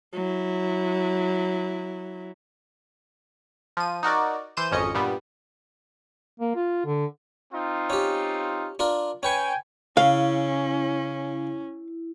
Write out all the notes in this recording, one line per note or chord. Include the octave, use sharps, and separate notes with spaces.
F#3 E4
F3 D#7
D#4 F#4 A#4 D5
E3 C5 G6 D#7 E7
G#1 F2 C#4 D#5 C#7
G2 A#2 G3 B3
A#3
F4
D3
C4 D#4 F4
C#4 G4
D4 F4 A#4
C#4 B4 G5 G#5 C#6
C#3 C#4 E4 F5